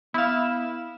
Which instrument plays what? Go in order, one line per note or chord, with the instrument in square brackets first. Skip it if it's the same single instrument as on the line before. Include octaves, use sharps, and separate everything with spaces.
[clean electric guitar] B3 F5 [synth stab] E4 E7